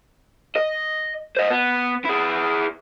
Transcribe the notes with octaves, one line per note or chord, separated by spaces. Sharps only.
D#5
C5 D#5
B3
E4 G#4